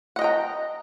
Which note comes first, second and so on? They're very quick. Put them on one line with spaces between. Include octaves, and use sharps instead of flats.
F#5 D#5 G5 A#5